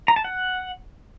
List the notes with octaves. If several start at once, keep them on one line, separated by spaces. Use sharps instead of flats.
A#5
A5
F#5